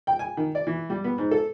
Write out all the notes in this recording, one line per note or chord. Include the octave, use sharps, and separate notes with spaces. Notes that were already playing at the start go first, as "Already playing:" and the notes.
G5
G#5
D#3
D5
E3
G3
B3
G#2
A4